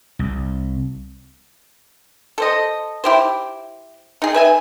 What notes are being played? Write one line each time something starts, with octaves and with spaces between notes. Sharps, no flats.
C2
A4 C5 D#5
E4 G4 C5
D#4 G#4
B4 E5 G#5